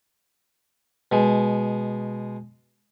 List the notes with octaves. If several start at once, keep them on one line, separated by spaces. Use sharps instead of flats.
B2 G#3